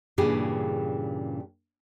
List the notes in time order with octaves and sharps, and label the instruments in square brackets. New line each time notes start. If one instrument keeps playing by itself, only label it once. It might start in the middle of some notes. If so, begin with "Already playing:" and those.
[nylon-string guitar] G2 A#2 C#3 E3 G4 G#4